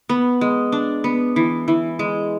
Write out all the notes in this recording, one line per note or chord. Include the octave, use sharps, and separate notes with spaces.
B3
G#3
D4
B3
E3
E3
G#3